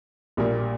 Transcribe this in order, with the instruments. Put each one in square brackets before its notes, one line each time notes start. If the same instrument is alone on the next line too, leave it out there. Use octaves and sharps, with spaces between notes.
[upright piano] A#1 A#2 G3 A#3